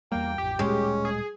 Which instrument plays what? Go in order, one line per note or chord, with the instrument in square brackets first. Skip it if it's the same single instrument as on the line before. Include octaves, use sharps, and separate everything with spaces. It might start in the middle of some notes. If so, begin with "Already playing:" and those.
[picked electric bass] E2 G3 [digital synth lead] A#3 [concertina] G5
[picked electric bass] A1 F2 [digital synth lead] G4
[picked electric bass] D1 A#2 G3 [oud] G#3 [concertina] C#4
[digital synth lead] G#4